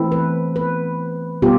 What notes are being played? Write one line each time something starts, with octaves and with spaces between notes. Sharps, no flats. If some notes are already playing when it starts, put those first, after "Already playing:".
Already playing: E3 A3 C4 E4
B4
B4
B2 G3 B3 F4 G4